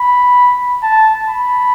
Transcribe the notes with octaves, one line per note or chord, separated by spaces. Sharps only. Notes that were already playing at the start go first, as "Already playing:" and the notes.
Already playing: B5
A5
B5